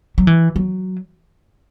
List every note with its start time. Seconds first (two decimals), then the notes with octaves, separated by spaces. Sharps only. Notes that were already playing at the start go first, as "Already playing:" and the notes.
0.18 F#3
0.27 E3
0.56 F#3